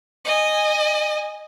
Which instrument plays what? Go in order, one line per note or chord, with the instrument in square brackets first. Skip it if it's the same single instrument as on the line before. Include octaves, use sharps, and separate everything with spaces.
[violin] D#5 G#5